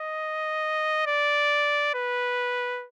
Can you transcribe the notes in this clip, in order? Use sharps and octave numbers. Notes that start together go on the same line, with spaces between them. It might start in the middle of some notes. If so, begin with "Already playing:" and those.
Already playing: D#5
D5
B4